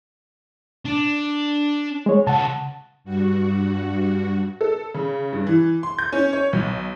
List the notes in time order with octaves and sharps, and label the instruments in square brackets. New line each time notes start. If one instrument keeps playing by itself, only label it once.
[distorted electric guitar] D4
[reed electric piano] G#3 C#5
[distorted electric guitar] C#2 [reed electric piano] F#5 A5
[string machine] G2 F#4
[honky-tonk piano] A4
C#3
G2
E3
C6
G6
C#4
C#5
B1